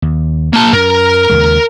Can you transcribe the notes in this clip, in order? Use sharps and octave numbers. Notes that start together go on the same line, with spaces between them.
D#2
A#3 A5
F#2 A#4
D#2 C#3 G#3